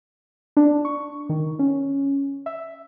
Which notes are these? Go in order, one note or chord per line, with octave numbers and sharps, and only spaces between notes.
D4
C#6
D#3
C#4
E5